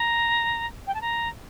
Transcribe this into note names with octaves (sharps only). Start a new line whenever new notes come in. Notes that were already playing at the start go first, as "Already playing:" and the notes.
Already playing: A#5
G5
A5
A#5